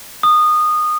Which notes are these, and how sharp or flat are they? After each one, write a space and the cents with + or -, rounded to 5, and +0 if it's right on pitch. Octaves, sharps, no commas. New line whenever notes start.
D#6 -20